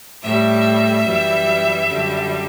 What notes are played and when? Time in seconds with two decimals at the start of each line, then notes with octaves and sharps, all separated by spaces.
0.23 A2 G3 E5
1.04 F#2 E3 G3
1.86 F#2 D3 G3